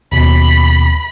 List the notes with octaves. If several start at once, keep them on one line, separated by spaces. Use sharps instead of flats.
D#2 B2 B5